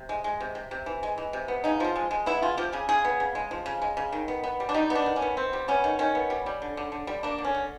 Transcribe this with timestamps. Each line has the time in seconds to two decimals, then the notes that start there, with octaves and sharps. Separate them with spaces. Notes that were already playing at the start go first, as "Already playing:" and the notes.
Already playing: C3
0.09 G#3
0.24 G#3
0.40 C3
0.55 C3
0.71 C3
0.86 E3
1.03 G#3
1.18 E3
1.33 C3
1.48 B3
1.64 C#3 D#4
1.80 F3 F4
1.96 G#3
2.11 G#3
2.26 B3 E4
2.42 C#3 F4
2.57 F3 G4
2.72 C#3 G#4
2.89 C#3 G#4
3.05 B3
3.20 C#3
3.35 G#3
3.51 F3
3.66 C#3
3.82 G#3
3.97 C#3
4.12 D#3
4.28 B3
4.44 B3
4.60 G3
4.69 D4
4.74 G3 D#4
4.90 B3
4.95 D4
5.06 D#3
5.16 C#4
5.22 B3
5.37 B3 C4
5.53 G3
5.68 B3 C#4
5.84 D#3
5.99 D#3 C#4
6.15 B3
6.30 G3
6.46 G3
6.62 D3
6.77 D3
6.92 D3
7.07 G3
7.23 A#3 D4
7.38 D3
7.44 C#4
7.55 D3